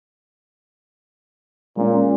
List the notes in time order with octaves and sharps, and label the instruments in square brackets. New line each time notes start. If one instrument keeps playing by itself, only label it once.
[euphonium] A#2 [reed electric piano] G#3 C#4